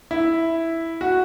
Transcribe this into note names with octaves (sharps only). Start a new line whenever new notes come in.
E4
F#4